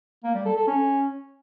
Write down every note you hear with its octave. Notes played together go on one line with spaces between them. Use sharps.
A#3
G3
A4
A4
C#4